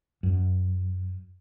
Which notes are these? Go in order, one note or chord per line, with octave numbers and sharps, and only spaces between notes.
F#2